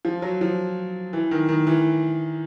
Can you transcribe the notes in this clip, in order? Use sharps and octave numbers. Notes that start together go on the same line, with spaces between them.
F3
F#3
F3
E3
D#3
D#3
E3